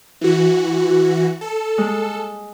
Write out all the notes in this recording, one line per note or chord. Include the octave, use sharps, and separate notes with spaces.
E3 F#4
A4
G#3